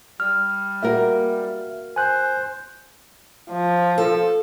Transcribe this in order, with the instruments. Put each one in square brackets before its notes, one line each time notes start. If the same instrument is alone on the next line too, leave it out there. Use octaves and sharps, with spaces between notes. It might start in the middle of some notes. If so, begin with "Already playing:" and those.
[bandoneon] G3 [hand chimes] F6
[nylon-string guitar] A#3 F#4 A#4 [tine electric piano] E5
[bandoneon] C5 [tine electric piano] G#5 F#6
[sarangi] F3
[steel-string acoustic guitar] A4